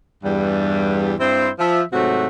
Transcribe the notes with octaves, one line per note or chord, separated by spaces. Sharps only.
E2 G2 G3
G2 C4 E4 C5
F3 E5
G#2 C3 F#3 A3 C4 F#4